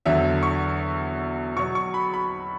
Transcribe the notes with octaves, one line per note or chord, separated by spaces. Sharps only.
E2 D3 F#3 E5
C#6
B2 F#3 C#6
C#6
B5
B5